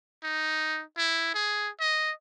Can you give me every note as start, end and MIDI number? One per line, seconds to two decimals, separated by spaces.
0.23 0.82 63
0.97 1.30 64
1.34 1.69 68
1.80 2.11 75